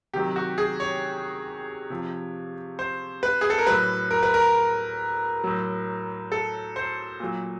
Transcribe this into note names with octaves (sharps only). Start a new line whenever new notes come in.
C3 D#3 F#3 G4
F#4
G#4
C#5
C3 F3
C5
B4
G#4
A4
A#4
A2 F#3 B4
A#4
B4
A#4
A2 F#3
A4
C5
A#2 F#3